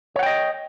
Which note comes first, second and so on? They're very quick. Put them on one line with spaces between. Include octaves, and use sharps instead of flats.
C#5 F#5 G5 D#5